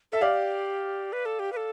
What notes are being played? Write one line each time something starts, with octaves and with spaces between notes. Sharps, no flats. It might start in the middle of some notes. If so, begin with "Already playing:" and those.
A4 E5
G4 D5 F5
B4
A4
G4
B4
A4